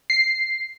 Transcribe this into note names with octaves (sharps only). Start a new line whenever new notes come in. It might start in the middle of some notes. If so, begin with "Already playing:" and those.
C7